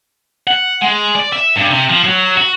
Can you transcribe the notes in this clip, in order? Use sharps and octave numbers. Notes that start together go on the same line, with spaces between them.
F#5
G#3
D5
E5
G2
C3
F3
F#3
F#4